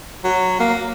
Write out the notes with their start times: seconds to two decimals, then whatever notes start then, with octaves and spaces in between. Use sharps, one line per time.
0.24 F#3
0.60 A#3